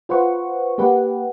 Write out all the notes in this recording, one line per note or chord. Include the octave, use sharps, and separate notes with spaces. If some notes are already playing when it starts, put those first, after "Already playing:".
F4 B4 C5 F#5 C#6
A#3 G4 B4 F#5